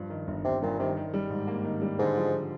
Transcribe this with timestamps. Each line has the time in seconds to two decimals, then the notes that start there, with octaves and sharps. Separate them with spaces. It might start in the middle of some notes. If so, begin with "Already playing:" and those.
Already playing: G2 F3
0.10 D#3
0.27 G1
0.45 G1 C3
0.62 G2 A#2
0.79 C3 D#3
0.97 D#3
1.14 G3
1.30 G#2
1.47 A#3
1.64 D#3
1.82 G3
1.99 G#2 D3
2.17 F3